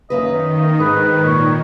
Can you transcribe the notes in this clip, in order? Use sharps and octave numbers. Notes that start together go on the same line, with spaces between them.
F#2 D#3 A#3 B4 D#5
G#2 D4 B4
A#2 C#5